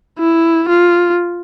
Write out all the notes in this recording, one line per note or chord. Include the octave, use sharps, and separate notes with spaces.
E4
F4